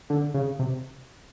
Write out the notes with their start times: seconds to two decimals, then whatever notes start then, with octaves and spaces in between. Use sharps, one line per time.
0.10 D3
0.34 C#3
0.59 C3